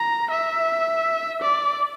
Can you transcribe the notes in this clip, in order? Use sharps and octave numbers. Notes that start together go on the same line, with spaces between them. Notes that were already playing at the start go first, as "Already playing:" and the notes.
Already playing: A#5
E5
D5